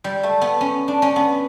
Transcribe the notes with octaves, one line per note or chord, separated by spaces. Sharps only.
G3
A3
B3
C#4
D4
C#4
B3